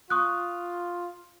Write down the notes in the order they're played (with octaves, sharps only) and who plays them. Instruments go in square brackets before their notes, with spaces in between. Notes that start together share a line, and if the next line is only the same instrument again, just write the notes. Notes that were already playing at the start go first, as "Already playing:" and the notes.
[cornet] F4 [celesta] C#6 D#6 F#6